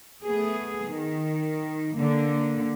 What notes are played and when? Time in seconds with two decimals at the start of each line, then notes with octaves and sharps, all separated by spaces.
0.24 A3 B3 G#4
0.87 D#3
1.96 D3 A#3